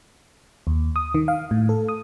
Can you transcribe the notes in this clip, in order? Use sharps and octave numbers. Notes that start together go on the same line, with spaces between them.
D#2
D#6
D#3
F5
A2
A4
D#6